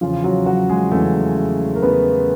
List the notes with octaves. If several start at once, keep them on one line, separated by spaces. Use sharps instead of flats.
E2 C#3 E3 F3 F4
F#3 F#4
F#3 F#4
G#3 G#4
E2 C#3 E3 A3 A4
A#4
E2 C#3 E3 B3 B4